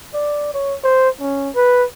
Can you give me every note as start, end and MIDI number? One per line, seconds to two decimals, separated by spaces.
0.14 0.53 74
0.54 0.75 73
0.84 1.09 72
1.20 1.50 61
1.55 1.84 71